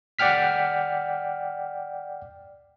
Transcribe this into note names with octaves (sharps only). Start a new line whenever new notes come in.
D5 F#5 G5 F6 B6